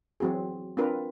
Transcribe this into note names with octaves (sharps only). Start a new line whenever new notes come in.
E3 F#3 C4 F#4 G#4
C4 D4 F4 A#4 B4